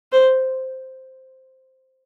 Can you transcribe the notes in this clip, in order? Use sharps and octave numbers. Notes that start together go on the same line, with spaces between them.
C5